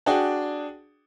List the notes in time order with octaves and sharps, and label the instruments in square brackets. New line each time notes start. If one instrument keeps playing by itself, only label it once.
[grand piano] D4 F#4 G#4 D5 G5